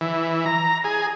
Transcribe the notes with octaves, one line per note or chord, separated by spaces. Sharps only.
E3
A#5
G#4